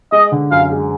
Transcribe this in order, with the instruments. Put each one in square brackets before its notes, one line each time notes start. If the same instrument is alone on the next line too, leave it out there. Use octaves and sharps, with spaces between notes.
[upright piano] G#3 [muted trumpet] D#5
[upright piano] D3
[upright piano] F#2 [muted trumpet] F5
[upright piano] G#3